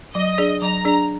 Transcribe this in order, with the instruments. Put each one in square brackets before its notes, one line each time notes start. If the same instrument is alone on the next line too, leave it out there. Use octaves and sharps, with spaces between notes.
[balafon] F#3 [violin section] D#5
[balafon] D4 G#4 D5
[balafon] F#3 [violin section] A#5
[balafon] D4 G#4 D5